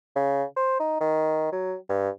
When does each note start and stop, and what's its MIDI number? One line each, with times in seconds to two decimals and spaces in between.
0.16 0.44 49
0.57 0.79 72
0.80 1.01 63
1.01 1.50 51
1.52 1.75 54
1.89 2.09 43